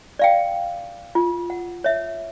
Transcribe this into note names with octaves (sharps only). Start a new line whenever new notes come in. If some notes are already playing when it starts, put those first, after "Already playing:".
D5 F5 G5
F4
F#5
C#5 E5